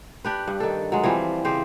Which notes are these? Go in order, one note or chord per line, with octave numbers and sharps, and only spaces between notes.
D4 G4 B4
G2
D#3 A4
F#3 G#3
E3 F3 G3 C4
C#3 C4 G4 C5